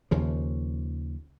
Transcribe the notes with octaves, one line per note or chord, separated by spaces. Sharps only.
D#2 C#3 F3